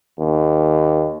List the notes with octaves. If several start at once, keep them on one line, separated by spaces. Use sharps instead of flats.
D#2